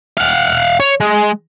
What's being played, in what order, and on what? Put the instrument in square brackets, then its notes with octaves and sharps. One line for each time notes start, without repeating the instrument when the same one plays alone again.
[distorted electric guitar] F5 F#5
C#5
G#3